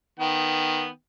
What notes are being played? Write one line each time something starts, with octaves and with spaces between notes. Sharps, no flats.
D#3 B3 G5